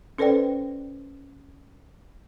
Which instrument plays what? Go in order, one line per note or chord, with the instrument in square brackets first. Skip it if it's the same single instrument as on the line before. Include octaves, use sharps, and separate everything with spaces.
[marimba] C#4 A4 B4 C5 D5 G5